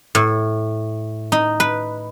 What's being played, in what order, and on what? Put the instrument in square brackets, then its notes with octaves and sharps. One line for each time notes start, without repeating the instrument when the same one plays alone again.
[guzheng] A2
D#4
B4